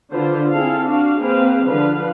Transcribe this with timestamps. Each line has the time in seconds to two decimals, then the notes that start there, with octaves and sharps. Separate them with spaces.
0.12 D3 F4 B4 C5
0.51 C4 E4 G#4 A4 F5
0.82 D4 F#4 F5
1.19 A#3 C4 G#4 B4 C5 F5
1.66 D3 F3 B4 F5